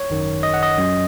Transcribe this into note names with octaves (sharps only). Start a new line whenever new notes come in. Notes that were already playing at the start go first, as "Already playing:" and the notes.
Already playing: C#5
G#1 F#2 D#3
D#5
F#5
D#5
F#2 F#3 C#4